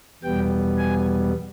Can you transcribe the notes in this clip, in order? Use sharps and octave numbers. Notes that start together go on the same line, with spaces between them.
E2 B2 G3 B3 G5
G#5